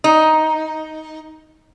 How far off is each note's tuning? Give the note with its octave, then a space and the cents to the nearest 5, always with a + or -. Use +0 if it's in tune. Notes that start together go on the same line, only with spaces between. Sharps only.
D#4 +10